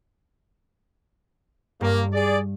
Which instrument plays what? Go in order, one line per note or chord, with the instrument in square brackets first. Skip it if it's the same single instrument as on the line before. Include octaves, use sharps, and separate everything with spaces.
[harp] G2 [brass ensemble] A#3
[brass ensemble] G#4 D5